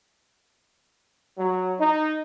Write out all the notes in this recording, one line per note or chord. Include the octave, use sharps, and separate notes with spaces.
F#3
D#4